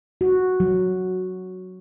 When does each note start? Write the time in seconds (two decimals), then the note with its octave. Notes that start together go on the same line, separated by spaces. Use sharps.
0.21 F#4
0.60 F#3